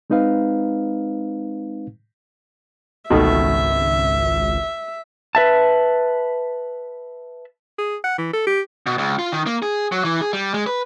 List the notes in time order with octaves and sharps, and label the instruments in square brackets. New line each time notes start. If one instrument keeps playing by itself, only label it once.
[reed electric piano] G#3 C4 D#4 B4 F5
[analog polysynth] G#1 C#2 [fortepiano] B2 D#3 A3 [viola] E5
[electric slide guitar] B4 E5 A5
[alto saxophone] G#4
F#5
E3
A4
G4
[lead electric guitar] B2
C#2
F4
D#3
A#3
G#4
F#3
E3
G#4
G3
G#3
B4